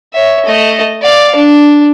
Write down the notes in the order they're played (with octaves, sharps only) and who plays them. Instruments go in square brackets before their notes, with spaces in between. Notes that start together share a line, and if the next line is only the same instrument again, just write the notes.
[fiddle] C#5 E5
A3 D#5
D5 F5
D4